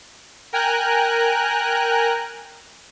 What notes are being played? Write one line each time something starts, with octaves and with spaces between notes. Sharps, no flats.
A#4 G5 G#5 A#5 F#6